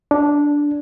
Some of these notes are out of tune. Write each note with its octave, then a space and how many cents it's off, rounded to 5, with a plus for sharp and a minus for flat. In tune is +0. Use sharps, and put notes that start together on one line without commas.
D4 -10